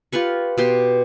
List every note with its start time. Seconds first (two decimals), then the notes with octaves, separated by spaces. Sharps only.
0.13 F4 G4 B4 C#6
0.58 B2 G4 C6